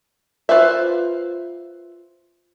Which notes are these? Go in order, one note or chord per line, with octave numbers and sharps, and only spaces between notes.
F4 B4 C5 E5